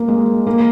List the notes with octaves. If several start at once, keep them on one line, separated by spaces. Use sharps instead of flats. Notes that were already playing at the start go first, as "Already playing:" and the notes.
Already playing: A#3
G#3
A#3